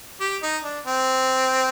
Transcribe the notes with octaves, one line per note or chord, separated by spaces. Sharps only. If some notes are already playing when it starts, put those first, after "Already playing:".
G4
D#4
D4
C4